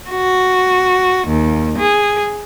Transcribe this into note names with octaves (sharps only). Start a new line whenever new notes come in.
F#4
D#2
G#4